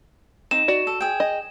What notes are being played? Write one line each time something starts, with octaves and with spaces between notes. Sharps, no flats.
C4 D#4 E7
F#4 D5
A4
G#4 G5
D#5